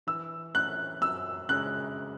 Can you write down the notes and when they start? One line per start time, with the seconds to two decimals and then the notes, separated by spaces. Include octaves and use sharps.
0.07 E3 E6
0.54 A3 C#4 F#6
1.01 F#2 E6
1.49 C#3 G#3 C#4 F#6